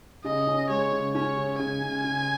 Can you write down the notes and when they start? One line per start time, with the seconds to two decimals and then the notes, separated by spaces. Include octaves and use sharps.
0.25 C#3 D#5
0.47 C#4
0.69 G#3 C#5
0.92 C#3
1.14 C#4 C#5
1.37 C#3
1.59 C#3 G#5
1.82 C#3
2.04 C#3